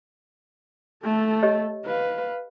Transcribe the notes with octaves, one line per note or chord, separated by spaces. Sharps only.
A3 A4
G4 C#5 D#5
B4 F5